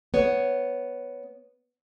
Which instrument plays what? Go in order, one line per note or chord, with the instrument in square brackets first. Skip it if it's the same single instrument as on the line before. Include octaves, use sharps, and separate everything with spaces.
[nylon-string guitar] B3 C#5